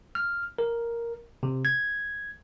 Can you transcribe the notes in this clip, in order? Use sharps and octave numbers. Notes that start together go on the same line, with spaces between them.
F6
A#4
C3
G#6